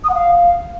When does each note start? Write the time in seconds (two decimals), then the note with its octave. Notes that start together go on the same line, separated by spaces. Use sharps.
0.04 D#6
0.09 F#5
0.15 F5